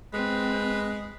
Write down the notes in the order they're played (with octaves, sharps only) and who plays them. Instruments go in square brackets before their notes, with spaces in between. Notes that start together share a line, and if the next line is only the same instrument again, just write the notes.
[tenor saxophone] G#3 [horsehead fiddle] C4 [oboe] B4